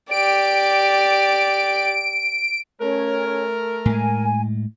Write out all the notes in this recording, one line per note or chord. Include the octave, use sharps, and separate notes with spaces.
G4 D5 D7
A3 C#4 A#4 C#5
A2 G#3 G#5